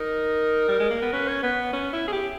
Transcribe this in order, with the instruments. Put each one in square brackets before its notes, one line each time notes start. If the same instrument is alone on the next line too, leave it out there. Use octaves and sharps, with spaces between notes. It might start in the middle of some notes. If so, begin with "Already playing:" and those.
Already playing: [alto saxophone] D#4 [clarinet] A#4
[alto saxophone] G3
G#3
A#3
B3
[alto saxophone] C#4 [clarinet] B4
[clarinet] C#5
[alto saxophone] B3 [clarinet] B4
[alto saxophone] C#4
E4
G#4
G4